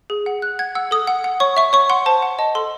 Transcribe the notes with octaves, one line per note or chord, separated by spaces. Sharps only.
G#4
F#5
F#5 F#6
F#5 G#6
F#5 E6
A4 D#6
F#5
F#5
C#5 C#6
E5 C#6
C#5 C#6
F#5 C6
C5 A5
F#5
D#5 A5
A4 C6